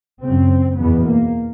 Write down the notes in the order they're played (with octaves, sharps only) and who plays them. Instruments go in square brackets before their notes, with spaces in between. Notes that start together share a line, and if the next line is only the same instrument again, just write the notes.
[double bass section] F#2 C#3 C4
E2 B2 B3
A#3